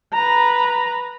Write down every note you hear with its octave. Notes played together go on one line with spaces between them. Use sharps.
B4 A#5